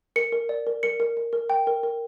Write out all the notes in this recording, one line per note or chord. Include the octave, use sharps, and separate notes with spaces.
A#4 C#7
A#4
D5
A#4
A#4 C#7
A#4
A#4
A#4
G5
A#4
A#4